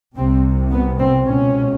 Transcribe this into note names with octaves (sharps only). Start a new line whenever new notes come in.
C2 C3 C4
B3
C4
C#2 B2 C#4